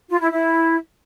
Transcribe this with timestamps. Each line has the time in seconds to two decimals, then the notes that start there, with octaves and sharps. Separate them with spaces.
0.09 F4
0.20 E4
0.30 E4